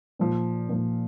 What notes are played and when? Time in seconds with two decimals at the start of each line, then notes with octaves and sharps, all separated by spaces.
0.19 A#2 F3
0.69 A#2 F3